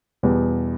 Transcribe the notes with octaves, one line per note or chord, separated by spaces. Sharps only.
E2 B2 G3